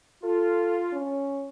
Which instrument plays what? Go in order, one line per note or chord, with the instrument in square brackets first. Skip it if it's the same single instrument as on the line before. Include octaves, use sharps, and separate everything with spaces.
[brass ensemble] F4 [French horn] A4
[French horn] C#4